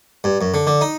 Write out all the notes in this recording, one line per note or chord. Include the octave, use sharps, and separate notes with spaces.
G2
F#2
D3
D3
D#4